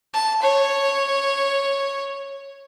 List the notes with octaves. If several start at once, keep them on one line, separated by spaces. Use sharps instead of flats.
A5
C#5